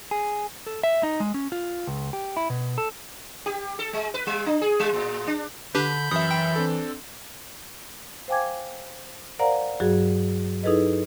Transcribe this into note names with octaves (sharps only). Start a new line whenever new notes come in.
G#4
A4
E5
D#4
G#3
C#4
F4
C#2
G4
E4
B2
A4
G4
A4
G#3
B4
G3
D4
G#4
G3
A2
D4
D3 D4 G4 B4 B5 G6
F#2 E3 E5 D#6
G5
C4 D4 A4
C5 F5 G5 G#5 D6 G#6
A#4 C5 D5 F5 F#5 A#5
G2 F#3 F#4 G#4
D#4 E4 G#4 A4 B4 D#5